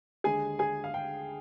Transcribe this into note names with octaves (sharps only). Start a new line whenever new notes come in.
D#2 D3 G#3 G#4 G#5
G#4 G#5
F5
G5